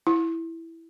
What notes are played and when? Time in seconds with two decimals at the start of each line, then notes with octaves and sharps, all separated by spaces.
0.07 E4